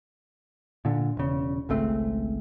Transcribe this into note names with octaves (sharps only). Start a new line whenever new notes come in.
A#2 D3
E1 C#3
G#1 C#2 A3 C4